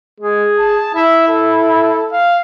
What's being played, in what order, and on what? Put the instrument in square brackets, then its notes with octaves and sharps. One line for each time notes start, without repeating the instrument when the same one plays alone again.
[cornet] G#3 [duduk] G#4
[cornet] A5
[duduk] E4 [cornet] E5
[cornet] A4
F5